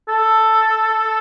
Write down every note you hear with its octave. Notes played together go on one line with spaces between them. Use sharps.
A4